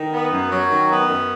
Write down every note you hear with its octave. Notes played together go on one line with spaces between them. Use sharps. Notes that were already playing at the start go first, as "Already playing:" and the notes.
Already playing: D#3
B3
F#2
F#3
D#3
B3
F#2